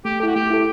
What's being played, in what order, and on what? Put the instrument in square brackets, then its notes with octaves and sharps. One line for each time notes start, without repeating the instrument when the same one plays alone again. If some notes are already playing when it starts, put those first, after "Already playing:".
[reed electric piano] A3 [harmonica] G4
[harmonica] G4 [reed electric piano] A4
[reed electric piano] E4 [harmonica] F#4
[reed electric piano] A3 [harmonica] G4
[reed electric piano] E4 A4